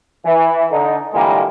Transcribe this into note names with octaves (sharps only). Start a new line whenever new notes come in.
E3
D3 D#4
A#2 D3 E3 G3 G#3 A#3